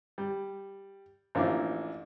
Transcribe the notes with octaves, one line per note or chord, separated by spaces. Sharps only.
G3
A1 F3 A#3 D4 E4 D6